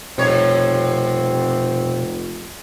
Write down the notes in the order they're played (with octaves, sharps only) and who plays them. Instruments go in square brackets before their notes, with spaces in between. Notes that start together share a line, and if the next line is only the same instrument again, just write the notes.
[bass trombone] F1 [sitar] G2 C#5 [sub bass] B2 [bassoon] C4